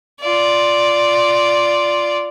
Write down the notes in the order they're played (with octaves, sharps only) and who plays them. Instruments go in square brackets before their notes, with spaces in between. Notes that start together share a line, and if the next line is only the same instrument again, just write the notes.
[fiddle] F4 D5